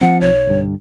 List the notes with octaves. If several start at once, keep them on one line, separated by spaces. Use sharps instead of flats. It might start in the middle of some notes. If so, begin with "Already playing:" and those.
F3 A#3 C4 F#5
B1 C#5
G1 G2